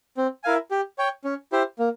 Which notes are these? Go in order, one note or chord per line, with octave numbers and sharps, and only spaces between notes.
C4
E4 A#4 F5 G#5
G4
C#5 G5
C#4
E4 G4 C5
A#3